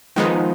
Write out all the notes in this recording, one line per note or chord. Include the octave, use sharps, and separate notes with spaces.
D#3 F3 G#3 B3 D#4